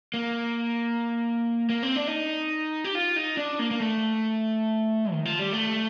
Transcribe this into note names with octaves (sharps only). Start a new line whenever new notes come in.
A#3
A#3
C4
D4
D#4
G4
F4
D#4
D4
A#3
A#3
A3
D#3
F3
G3
A3